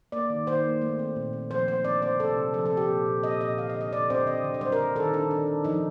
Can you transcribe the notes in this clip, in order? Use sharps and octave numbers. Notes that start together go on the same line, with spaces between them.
A#3 D5
D#3
D#3 C5
A#3
A3
C4
A#2
C4
F3 C5
D3 C5
C4 D5
D3 C5
C3 A4
C3
F3 A4
A4
C4
G4
A#2
A#2
C4 D#5
A#2 D#5
D3 F5
D#5
D3
D#5
D3 D5
C4 C5
D3 D#5
D3
D5
G3 C5
A#4
D3
D#3 A4
D#3 D4
D#3 D4
D#3
F3 D#4